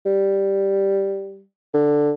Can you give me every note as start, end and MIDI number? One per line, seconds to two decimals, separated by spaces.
0.06 1.43 55
1.74 2.12 50